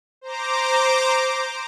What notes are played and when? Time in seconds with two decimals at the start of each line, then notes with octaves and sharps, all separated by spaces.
0.21 C5 A#5 D6